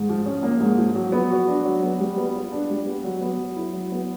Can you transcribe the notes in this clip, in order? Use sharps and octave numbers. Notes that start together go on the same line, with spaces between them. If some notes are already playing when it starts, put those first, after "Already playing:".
Already playing: G#2
F3
C#4
A#3
G#2
F3
F#3
B3
F#4
D4
F#3
B3
G3
B3
F4
D4
G3
B3
F#3
B3
F#3
E4
F#3
B3